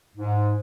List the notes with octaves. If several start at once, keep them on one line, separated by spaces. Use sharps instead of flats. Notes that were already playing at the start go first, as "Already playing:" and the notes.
G#2